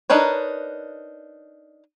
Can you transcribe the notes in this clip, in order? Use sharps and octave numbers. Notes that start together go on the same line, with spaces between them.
D4 D#4 A#4 B4 C#5